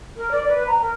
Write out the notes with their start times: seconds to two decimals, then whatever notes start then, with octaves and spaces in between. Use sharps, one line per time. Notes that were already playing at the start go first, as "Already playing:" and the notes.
0.16 A#4
0.31 D5
0.48 B4
0.67 A#5
0.81 A#4